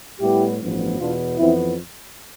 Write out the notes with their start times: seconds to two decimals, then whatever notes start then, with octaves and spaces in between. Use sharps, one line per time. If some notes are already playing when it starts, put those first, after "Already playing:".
0.20 A2 G3 B3 E4 G4
0.60 A1 G2 F3 B3
0.98 E2 B2 B3 D4 F4
1.38 F2 E3 B3 C4 E4